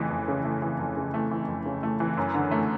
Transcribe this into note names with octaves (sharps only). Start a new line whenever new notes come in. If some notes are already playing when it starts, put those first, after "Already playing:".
Already playing: F2 C#3 E3 A3
F2
C#3
A3
E3
F2
C#3
A3
E3
F2
C#3
A3
E3
F#2
D3
A3